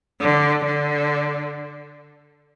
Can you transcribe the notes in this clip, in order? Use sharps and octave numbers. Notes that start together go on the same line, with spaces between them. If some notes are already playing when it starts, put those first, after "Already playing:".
D3
D3